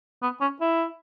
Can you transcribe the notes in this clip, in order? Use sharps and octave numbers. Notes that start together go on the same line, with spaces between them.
B3
C#4
E4